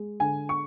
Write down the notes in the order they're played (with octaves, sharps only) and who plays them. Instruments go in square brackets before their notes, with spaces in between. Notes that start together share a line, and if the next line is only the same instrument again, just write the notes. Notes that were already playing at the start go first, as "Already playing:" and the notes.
Already playing: [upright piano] G#3
D3 G#5
C#6